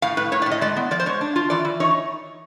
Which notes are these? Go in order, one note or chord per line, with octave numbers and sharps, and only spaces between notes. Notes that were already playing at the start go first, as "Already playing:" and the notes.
A2 F5
A2 B4
A2 C#5
D5
A2
D#5
G#3 D5
B3
F3 D5
C5
G#3 C#5
D4
F4
E3 D5
E3
D#4 C#5